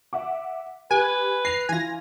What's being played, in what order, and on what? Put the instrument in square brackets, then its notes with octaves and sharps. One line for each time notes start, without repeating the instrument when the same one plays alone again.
[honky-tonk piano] E5 F#5 D6
[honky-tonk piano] G4 [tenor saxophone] B4 [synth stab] G#5
[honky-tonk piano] A#6 F7 [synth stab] C7
[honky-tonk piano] E3 F4 [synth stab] G#5 A#6